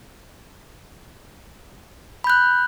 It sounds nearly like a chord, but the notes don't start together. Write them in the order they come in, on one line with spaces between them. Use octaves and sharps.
B5 G6 F#6